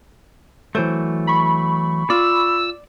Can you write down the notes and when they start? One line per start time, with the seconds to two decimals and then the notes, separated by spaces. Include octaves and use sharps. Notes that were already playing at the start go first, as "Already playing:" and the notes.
0.75 E3 F#3 A3 C5
1.27 B5 C#6
2.10 F4 D5 E6